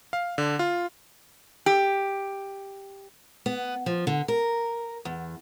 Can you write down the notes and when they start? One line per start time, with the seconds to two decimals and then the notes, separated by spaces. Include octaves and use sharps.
0.13 F5
0.38 D3
0.59 F4
1.66 G4
3.46 B3
3.86 F3
4.07 D3
4.28 A#4
5.05 E2